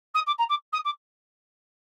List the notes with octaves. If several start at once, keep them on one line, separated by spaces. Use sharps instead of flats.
D#6
D6
A#5
D6
D#6
D6